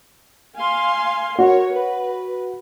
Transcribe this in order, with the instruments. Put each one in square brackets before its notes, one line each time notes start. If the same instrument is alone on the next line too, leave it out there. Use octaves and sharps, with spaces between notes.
[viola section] F5 G#5 C6
[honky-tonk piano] F#4 [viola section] A#4 C#5
[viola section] B4